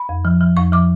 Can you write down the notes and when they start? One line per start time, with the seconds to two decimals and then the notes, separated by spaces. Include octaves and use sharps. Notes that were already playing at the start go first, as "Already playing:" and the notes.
Already playing: B5
0.09 F2
0.25 F3
0.41 F3
0.57 F2 C#6
0.72 F3 D6